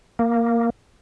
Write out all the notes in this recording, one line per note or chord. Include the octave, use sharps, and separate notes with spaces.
A#3